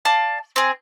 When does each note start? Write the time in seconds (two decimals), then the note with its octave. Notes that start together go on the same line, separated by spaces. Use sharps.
0.05 D5 F5 A5
0.56 C4 G#4